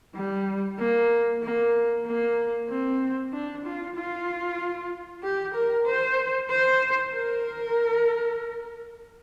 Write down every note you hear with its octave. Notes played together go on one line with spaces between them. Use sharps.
G3
A#3
A#3
A#3
C4
D4
F4
F4
G4
A#4
C5
C5
A#4